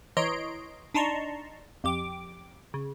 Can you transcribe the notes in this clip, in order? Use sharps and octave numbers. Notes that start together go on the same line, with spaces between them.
E3 C#5 D#5 A#5 C6 D7
D4 D#4 A5 A#5 C6 C#6
F2 G4 D6
C#3